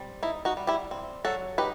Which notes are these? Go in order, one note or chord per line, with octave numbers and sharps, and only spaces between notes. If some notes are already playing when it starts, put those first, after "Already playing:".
Already playing: G3 C4
D#4 E4
D#4 F#4
G3
E4 G4
C4
F#3 F#4 A4
D#4 G4 B4